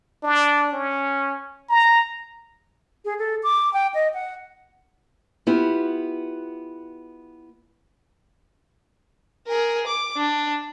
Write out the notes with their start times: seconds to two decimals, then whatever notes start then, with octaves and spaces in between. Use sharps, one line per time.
0.23 D4
0.73 C#4
1.69 A#5
3.05 G#4
3.19 A4
3.43 D6
3.73 G5
3.94 D#5
4.14 F#5
5.47 B3 E4 F4 G4
9.47 G#4 A#4
9.87 D6
10.17 D4